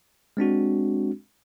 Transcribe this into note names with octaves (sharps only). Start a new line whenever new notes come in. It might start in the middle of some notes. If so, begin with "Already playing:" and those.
G#3 C4 D4 F#4